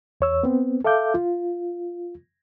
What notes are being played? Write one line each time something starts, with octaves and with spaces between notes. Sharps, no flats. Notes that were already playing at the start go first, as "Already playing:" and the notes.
E2 C#5 E6
B3 C4
A4 E5 F5 D6 G6
F4